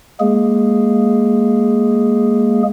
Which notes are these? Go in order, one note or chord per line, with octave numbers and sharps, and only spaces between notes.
G#3 A#3 G#4